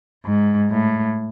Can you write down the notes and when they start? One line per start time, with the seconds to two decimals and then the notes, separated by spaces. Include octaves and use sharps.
0.25 G#2
0.71 A2